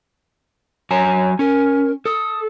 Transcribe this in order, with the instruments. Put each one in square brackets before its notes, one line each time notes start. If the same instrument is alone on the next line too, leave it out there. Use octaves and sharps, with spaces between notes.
[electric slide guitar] F#3 G#5 A#5 [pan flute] C#5
[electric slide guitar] C#4 [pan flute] A#4
[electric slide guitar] A4 [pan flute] D#6